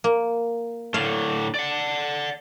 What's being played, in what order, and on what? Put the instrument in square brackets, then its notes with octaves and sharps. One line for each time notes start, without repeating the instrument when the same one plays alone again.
[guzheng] A#3
[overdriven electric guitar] A2 D3 [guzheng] F5
[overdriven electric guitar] D5 F#5